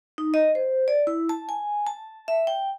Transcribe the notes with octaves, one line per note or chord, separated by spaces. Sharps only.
D#4
D#5
C5
D5
E4
A5
G#5
A5
E5
G5